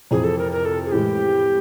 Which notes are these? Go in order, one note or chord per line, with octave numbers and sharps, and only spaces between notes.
F2 C3 E3 G#4
A4
A#4
A#4
A4
G#4
A2 E3 G#3 G4